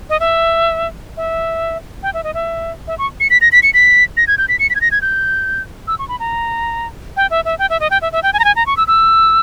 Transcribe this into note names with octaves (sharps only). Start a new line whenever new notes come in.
D#5
E5
E5
G5
E5
D#5
E5
E5
C#6
C#7
B6
A#6
B6
C#7
B6
A#6
G#6
G6
B6
C#7
B6
G#6
A#6
G#6
G6
E6
C#6
B5
A#5
G5
E5
E5
G5
E5
D#5
G5
E5
E5
G5
G#5
A#5
G#5
A#5
C#6
E6
E6